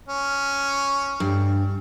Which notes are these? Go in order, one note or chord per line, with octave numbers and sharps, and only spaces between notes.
C#4
G2